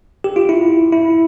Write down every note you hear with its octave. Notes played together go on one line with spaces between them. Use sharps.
G4
F4
E4
E4